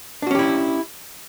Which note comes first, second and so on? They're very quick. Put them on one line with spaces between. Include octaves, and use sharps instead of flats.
D4 F#4 C#4 G4 E4